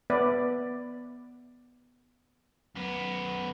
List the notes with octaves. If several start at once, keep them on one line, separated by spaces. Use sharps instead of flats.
B3 B4 D5 E5
F#2 B3